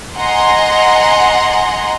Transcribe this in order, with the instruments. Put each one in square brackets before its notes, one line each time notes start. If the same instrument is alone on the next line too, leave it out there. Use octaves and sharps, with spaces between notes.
[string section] D#5 F#5 G#5 A#5 C6